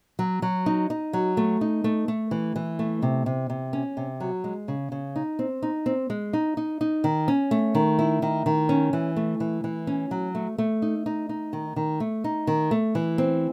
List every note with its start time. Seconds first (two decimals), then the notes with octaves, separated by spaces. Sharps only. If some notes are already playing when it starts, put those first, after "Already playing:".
0.19 F#3
0.42 F#3
0.66 D#4
0.90 D#4
1.13 F#3
1.37 A3
1.61 D#4
1.84 A3
2.08 A3
2.31 E3
2.56 E3
2.79 A3
3.02 C3
3.26 C3
3.50 C3
3.73 C#4
3.97 C3
4.20 F#3
4.44 G#3
4.68 C#3
4.92 C#3
5.16 D#4
5.39 C4
5.62 D#4
5.86 C4
6.10 G#3
6.33 D#4
6.57 D#4
6.81 D#4
7.04 D#3
7.28 C#4
7.51 A3
7.75 D#3
7.99 E4
8.22 D#3
8.46 D#3
8.69 C#4
8.93 E3
9.16 A3
9.40 E3
9.64 E3
9.87 C#4
10.11 F#3
10.35 A3
10.58 A3
10.82 D#4
11.06 D#4
11.29 D#4
11.53 D#3
11.76 D#3
12.00 A3
12.24 D#4
12.47 D#3
12.71 A3
12.95 E3
13.18 C4